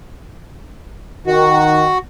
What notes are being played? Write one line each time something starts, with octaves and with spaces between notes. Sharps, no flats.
D#3 F#4